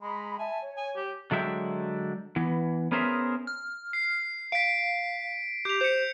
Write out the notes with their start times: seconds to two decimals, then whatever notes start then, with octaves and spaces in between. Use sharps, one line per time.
0.01 G#3 A#5 B5
0.39 E5 G#5 A5
0.62 C#5
0.77 G#5
0.96 G4
1.31 D3 F#3 G#3 E5 G5
2.36 E3 B3
2.92 B3 C#4 G#4 A#4 C5 E5
3.47 F6
3.93 C7
4.52 F5 B6 D7
5.65 G4 G6 F7
5.81 C5 G6 C#7